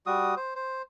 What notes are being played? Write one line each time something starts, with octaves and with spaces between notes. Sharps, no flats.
G3 F#4 D#6
C5
C5